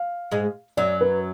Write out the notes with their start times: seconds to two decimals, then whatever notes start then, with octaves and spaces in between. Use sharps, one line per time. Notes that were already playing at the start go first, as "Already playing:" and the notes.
Already playing: F5
0.31 G#2 G#3
0.77 F#2 F#3 D5
1.01 B4